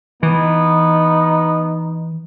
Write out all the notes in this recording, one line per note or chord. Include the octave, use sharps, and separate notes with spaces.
E3 B3 D#4